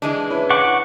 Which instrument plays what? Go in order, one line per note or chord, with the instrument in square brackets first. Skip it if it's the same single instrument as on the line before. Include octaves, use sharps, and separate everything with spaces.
[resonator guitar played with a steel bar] E3 G#3 D4
[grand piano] C#4 E4 B4
[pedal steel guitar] F#5 C#6 D6